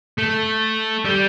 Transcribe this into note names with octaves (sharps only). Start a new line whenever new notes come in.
A3
G3